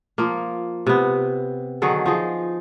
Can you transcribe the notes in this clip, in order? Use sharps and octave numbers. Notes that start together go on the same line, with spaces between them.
F3 A#3
C3 B3
D3 D#3 F#3 G#4
F3 D#4 G#4